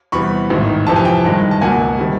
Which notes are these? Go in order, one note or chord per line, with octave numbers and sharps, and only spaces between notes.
E2 C3 E3 G3 B5 C#6
A1 G#2 D#3
F2 C3 E3 A5
G#5
G5 A5
G2 D#3 G#3
A5
C#2 B2 F#3 A#3 F#5 G#5
C3 D#3 G3